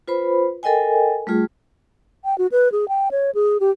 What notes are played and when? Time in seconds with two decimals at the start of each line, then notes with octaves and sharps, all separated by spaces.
0.08 F4 B4 C5 B5
0.63 A4 A#4 D#5 G5 G#5
1.27 G3 A3 F4 G#4
2.25 G5
2.38 F#4
2.52 B4
2.72 G#4
2.88 G5
3.11 C#5
3.35 G#4
3.60 G4